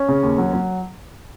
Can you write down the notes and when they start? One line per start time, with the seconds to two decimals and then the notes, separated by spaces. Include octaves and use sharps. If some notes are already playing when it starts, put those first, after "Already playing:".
Already playing: C#4
0.08 C#3
0.23 D#2
0.38 F#3
0.53 F#3